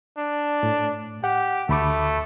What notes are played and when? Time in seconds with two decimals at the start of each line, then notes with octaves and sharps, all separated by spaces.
0.18 D4
0.63 A2
1.24 G4 F#5
1.69 D2 A3 B5 D6